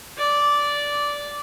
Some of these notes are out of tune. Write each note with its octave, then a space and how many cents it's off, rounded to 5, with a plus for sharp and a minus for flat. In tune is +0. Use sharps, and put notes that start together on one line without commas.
D5 -10